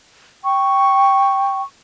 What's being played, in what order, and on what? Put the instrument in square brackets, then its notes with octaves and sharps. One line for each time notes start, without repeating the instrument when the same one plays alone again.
[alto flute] G5 [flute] C#6